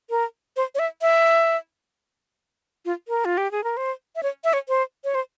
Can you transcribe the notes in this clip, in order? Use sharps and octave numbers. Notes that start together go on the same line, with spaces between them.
A#4
C5
C#5
E5
E5
F4
A#4
F4
G4
G#4
A#4
C5
E5
C#5
E5
C#5
C5
C#5
C5